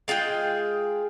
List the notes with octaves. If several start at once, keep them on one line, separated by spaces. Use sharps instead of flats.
G#3 F4 G#4 G5